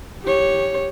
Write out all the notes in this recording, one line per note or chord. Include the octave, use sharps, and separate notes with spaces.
G4 C#5